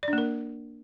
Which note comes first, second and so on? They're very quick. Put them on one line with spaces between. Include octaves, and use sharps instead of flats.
D5 D4 A#3 A#4